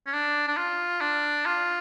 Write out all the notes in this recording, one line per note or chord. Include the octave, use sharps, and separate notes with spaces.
C#4
D4
D4
F4
D4
F4